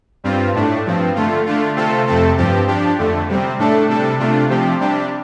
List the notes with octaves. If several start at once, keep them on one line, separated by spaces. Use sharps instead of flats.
G2 G3 C4 F4
A2 A3 D4
G2 F3 C4
D3 A3 F4
D3 A3 D4 F4
C3 A3 C4 F4 A4
F2 C3 A3 C4 A4
G2 F3 C4 G4
F3 D4 G4
F2 D3 A3
C3 G3 C4
A2 A3 D4 A4
C3 G3 D4 A4
C3 A3 D4 F4
C3 F3 C4 G4
C3 G3 D4 G4